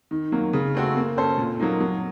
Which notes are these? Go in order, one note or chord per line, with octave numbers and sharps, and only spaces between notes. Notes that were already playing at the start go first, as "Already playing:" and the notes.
D#3
F#3 A#3
C#3
A3 C4 F#4
A#3
C#4 A4 C5
A#2
F#3 A#3 D#4
F#3